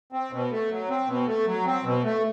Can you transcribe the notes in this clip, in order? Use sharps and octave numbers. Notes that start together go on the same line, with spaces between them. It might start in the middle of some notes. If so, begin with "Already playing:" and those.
C4
B2
A3
F#3
C4
B2
A3
F#3
C4
B2
A3